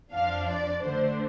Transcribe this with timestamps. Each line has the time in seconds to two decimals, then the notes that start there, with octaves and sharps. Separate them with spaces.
0.11 F2 F3 D4 F5
0.47 D5
0.82 D3 A3 D4 C5